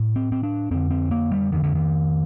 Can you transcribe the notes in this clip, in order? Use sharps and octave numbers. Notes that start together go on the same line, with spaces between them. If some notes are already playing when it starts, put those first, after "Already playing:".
Already playing: A2
C4
C4
D4
F2 D3 C4
C4
A#3
G3
F2 D3 D#3
D3
D#3